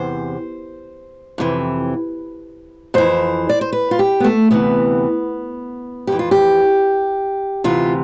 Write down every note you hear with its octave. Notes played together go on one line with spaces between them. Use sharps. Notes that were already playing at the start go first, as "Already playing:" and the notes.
Already playing: E2 C3 E3 C5
F2 C3 E3
F2 E3 C5
D5
C5
B4
F4
G4
B3
A3
D2 C3 E3 B3
F2 E3 G4
F4
G4
D2 C3 E3 F4